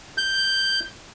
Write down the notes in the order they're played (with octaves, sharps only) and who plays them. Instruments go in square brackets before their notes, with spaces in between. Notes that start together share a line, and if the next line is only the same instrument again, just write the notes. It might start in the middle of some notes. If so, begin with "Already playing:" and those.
[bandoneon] G6